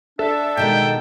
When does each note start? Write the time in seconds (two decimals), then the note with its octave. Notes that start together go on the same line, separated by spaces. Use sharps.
0.19 D4 A4 E5
0.57 B2 D#3 G#3 G5